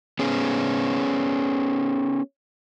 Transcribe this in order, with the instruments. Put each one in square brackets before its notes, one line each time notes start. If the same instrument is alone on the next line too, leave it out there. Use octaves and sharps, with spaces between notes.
[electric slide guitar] B3 C#4 G#4